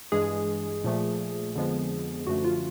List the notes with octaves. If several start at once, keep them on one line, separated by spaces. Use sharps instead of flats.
G2 E3 G#3 G#4
A#2 F3 A3
F2 D3 F3 G#3 B3
F#2 D3 F3 A3 F#4
F4